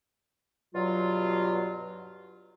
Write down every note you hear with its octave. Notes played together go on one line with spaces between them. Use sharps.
G2 B2 F#3 F4